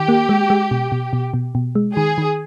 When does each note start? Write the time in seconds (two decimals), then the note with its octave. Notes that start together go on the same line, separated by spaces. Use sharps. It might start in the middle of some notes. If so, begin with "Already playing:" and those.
Already playing: D#3 G4
0.08 A#3
0.29 G#3
0.50 G#3
0.71 B2
0.92 B2
1.13 B2
1.34 B2
1.55 B2
1.75 G#3
1.96 D#3 G#4
2.18 D#3